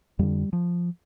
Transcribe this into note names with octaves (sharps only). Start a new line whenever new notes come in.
F2 D3 G3
F3